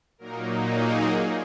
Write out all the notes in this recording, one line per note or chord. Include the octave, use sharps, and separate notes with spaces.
A#2 F#3 A#3 D#4 A#4
G#4